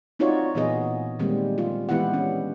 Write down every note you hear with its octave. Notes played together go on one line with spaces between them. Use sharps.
C4 D#4 F4 F#4 C#5 D5
A#2 E3 B3 G#4 D#5
D#3 G3 G#3 A#3 C4
F4
E3 G#3 B3 E4 G4 F#5
C#4 D4